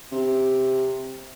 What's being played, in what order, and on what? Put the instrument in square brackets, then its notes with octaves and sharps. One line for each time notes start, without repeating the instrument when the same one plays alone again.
[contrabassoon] C3